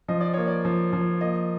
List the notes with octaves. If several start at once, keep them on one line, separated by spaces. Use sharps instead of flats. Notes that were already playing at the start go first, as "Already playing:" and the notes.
F3 D#5
D5
A#3 C#5
D5
F3
F3
A#3 D#5